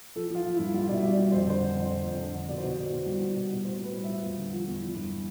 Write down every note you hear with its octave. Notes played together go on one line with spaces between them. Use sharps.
F3 A4
F3 F4
F3
E4
G2
G3 F4
B2 D5 E5
G3
D5
G3
F2 C5
D5
D3 C5
D3
F2
D3
F2
D3
D3
B2 D5
C5
B2 D5
B2
B2
G3
G3
B2
B2
A2 C5
G3 B4
G3
E5
G3
E2 F4
D3
F3
E2
F3 E4
G2